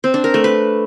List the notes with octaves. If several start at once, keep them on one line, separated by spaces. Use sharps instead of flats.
C4
D4
A#4
A3
B4